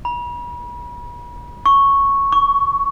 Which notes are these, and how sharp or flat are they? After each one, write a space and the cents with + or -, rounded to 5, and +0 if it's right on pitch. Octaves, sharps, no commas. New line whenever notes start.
B5 -40
C#6 -5
C#6 +20